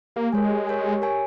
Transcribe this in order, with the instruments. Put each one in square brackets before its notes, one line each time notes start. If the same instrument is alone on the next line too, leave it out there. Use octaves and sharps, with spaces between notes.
[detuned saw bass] A#3 [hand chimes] G4
[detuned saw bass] G#3 [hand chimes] A#4 C#5 G#5
[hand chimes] G4
A#4 C#5 G#5
G4
A#4 C#5 G#5